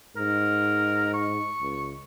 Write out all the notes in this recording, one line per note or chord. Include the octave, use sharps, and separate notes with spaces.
G#2 A#4
C#6
C#2